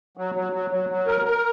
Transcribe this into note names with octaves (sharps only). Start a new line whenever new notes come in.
F#3
F#3
F#3
F#3
F#3
A#4
A#4